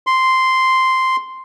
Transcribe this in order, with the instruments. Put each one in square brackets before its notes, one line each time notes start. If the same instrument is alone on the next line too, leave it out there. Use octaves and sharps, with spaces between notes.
[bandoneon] C6